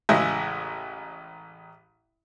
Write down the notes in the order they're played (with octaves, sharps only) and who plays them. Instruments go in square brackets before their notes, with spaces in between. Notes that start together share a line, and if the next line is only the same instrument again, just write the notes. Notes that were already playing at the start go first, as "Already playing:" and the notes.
[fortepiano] A1 C#3 G#3 E4 E5